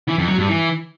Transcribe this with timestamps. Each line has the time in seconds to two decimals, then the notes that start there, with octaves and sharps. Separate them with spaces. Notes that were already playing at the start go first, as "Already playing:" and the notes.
0.08 E3
0.18 F2
0.28 F#3
0.38 G2
0.48 E3